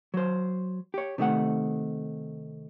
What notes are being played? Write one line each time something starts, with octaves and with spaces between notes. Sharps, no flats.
F#3 C5
G4 C#5
C3 D#3 A3 F#5